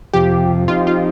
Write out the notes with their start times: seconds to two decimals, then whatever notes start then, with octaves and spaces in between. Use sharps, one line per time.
0.13 F2 C3 F3 G4
0.68 F3 C4 D#4 F4 G4
0.87 F4